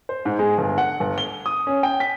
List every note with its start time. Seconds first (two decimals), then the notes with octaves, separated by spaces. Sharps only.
0.09 C5
0.25 G#2
0.39 G#3
0.58 G1
0.78 F#5
1.00 G1
1.18 G7
1.46 D#6
1.67 C#4
1.83 G5
2.00 B6